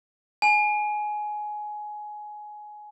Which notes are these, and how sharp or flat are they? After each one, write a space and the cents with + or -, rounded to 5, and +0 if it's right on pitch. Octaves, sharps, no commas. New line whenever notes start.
G#5 +15